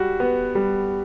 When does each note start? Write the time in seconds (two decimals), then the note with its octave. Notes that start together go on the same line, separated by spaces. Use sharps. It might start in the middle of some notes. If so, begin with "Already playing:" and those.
Already playing: G3 F#4
0.20 B3
0.55 G3